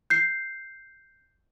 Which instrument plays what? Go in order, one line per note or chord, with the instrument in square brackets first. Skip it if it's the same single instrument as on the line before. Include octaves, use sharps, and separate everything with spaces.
[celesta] G6 C7